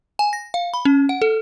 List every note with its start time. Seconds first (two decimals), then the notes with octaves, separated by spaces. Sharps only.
0.19 G#5
0.33 A#6
0.54 F5
0.74 B5
0.85 C#4
1.09 F#5
1.22 A4